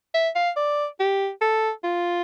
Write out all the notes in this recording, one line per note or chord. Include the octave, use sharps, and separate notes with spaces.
E5
F5
D5
G4
A4
F4